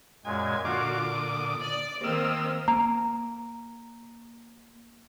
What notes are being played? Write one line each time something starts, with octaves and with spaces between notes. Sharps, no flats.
F#2 A#2 G#3 G#5
A#2 D3 F4 F#4 F5 D6
D#6
D5
D#3 A#3 C4 D#5 E6 F6
A#3 A#5